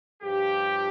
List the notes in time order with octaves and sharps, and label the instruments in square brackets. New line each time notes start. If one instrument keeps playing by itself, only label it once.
[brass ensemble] G2 F3 G4